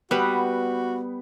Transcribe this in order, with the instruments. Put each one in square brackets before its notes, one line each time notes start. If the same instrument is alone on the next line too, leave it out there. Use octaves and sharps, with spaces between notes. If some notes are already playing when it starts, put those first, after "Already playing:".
[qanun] G3 B4 F#5 [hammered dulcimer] B3 [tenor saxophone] F#4